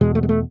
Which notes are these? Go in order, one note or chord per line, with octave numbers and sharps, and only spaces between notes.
E2 B2 G#3
A3
G#3
A3